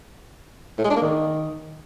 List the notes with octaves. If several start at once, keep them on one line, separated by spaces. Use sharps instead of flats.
A2
G#3
D4
A#3
D#3